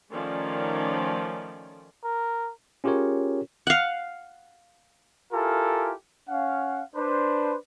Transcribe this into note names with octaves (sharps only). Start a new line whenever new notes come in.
D#3 F3 A3 C#4 D5
A#4
C#4 F4 G4 G#4 A#4 C#5
F5 F#5
E4 F4 G4 A4 A#4 G#5
C#4 F5 F#5
D4 B4 C5